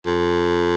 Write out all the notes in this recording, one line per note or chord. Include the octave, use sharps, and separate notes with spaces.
F2